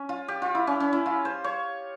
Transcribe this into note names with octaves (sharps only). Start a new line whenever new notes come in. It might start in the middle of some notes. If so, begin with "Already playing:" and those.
Already playing: C#4
F4
G4
F4
E4
C#4
C#4
E4
F4
C5
C#5